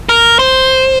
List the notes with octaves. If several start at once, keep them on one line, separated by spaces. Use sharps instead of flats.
A#4
C5